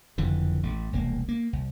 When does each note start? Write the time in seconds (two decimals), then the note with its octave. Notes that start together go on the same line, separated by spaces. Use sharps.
0.18 F#1 F2 D3 E3
0.63 A1 A3
0.93 E1 C2 A#3
1.29 A#3
1.53 C2